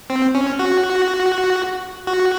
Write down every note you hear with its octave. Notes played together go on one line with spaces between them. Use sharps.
C4
C#4
F#4
F#4